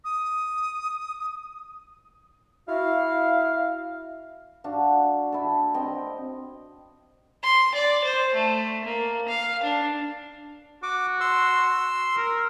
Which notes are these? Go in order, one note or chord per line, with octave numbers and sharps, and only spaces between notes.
D#6
E4 F#4 F5
D4 F#4 F5
E4 A4
C4 D#5 G5
C6
D5
C5
A3
A#3
F5
D4
F#4 D6
C6 E6
A#4